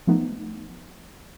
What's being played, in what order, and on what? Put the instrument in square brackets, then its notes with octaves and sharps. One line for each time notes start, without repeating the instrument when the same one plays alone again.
[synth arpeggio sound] F3 A3 B3 D#4